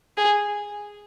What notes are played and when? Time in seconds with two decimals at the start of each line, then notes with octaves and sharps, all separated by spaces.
0.17 G#4